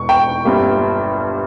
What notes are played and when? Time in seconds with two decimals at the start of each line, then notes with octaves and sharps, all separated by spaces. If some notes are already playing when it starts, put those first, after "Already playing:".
Already playing: E1 C#6
0.09 G5
0.45 G1 G2 G3 A#3